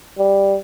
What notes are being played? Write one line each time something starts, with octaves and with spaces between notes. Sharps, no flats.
G3